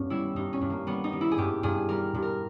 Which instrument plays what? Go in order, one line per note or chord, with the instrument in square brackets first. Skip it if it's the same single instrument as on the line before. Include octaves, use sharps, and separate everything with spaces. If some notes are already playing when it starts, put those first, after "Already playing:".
Already playing: [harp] G2 B3 C#4
G3 E4
G2 D#4
C#4
G2
A#3
G3 B3
D#4
G3
E4
G#4
G2 G4
G2 G#4
G3 A#4
G2
A#4